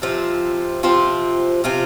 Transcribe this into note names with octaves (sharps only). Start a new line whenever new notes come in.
C3 F3 C4 F4
C3 F3 C4 F4
C3 F3 C4 F4